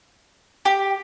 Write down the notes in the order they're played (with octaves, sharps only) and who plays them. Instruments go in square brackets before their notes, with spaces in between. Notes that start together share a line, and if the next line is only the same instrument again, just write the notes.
[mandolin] G4